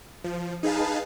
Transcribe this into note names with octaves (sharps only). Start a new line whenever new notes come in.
F3
D#4 G#4 B4 F5 A5